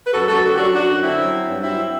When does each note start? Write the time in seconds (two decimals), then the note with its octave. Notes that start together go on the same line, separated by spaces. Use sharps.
0.06 B4
0.12 F#2 F#4 A4
0.27 F#2 F#4 A4
0.43 D3 F#4 A4
0.54 G4
0.57 F#3 D4 F#4
0.73 F#2 D4 F#4
0.88 F#2
1.02 D3 C4 E4
1.19 F#3
1.32 F#3
1.48 G2
1.63 F#3 C4 E4